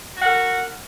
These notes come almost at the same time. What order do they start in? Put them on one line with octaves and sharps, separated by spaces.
F#4 F#5 A#4